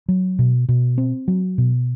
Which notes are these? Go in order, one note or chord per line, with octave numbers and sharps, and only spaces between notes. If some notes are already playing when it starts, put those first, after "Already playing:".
F#3
B2
B2
C4
F#3
B2